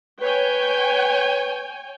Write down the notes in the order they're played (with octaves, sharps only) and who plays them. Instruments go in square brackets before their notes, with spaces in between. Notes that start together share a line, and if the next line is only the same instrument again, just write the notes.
[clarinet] B4 [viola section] C#5 G5 G#5